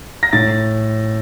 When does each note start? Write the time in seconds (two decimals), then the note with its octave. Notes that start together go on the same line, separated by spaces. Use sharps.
0.23 A#6
0.33 A2 A6